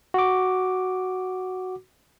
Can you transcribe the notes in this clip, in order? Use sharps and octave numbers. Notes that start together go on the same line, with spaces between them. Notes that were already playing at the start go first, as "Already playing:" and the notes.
F#4 D6